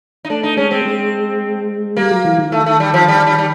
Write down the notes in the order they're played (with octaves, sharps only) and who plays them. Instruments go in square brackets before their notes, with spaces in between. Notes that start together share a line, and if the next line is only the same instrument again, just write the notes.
[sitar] D#4
[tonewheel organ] A3 [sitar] D4
[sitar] D#4
[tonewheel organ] G#3 [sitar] C#4
[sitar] C4
[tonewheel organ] G#3
[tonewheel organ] G3 [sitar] A#3
[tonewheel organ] F#3
E3
D#3
[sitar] A3
A3
G3
F3
G3
G3
G3